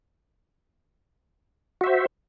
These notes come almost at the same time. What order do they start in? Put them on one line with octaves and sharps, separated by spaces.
F#4 E5 C5